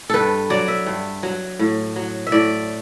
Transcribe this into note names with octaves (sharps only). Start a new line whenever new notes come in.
G2 A4 B4
F#3 D5
E5
G2
F#3
A2
F#3
E5
A2 D5